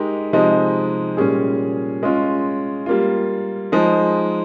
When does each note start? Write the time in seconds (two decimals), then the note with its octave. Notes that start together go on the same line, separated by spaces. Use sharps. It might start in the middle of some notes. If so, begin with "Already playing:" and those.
Already playing: G#3 D#4 G4 A#4
0.33 C3 F3 G#3 D#4
1.17 A#2 G3 C#4 G#4
2.03 G#3 C#4 F4
2.86 G3 A#3 F4
3.72 F3 G#3 D#4